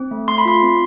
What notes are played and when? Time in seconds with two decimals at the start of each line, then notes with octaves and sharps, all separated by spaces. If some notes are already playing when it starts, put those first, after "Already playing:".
Already playing: C4
0.11 A3
0.28 A3 C6
0.38 B5
0.45 F4 C6
0.62 C4